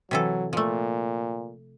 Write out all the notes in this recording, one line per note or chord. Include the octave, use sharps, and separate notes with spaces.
C3 E3 F#3 A4
A#2 F3 A3